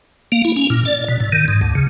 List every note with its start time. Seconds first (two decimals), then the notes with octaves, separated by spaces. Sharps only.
0.32 A#3
0.45 E4
0.56 C#4
0.70 A#2
0.85 D5
1.08 B2
1.20 A2
1.32 D#3
1.48 G#2
1.61 D2
1.75 C#3